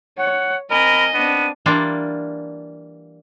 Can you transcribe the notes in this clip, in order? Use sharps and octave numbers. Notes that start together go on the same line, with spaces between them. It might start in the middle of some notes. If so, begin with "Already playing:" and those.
C#5 F#5
C4 A#4 D#5 G#5 B5
B3 C4 D4 D#7
E3 G3 A#3 D4 F4